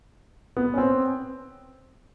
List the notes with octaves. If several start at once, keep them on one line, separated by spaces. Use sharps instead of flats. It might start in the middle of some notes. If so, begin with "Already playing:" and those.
B3
C#4
C4